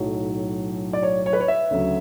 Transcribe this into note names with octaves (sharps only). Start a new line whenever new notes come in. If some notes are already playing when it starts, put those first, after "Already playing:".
Already playing: B1 A2 F#3
D5
C#5
C#5
B4
C#5
E5
D2 C#3 F#3